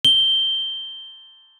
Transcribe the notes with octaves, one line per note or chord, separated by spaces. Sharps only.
G7